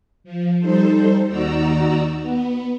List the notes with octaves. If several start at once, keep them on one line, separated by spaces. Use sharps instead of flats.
F3
G3 D#4 A4 C5
D#2 D#4 F#4 D5 A#5 E6
B3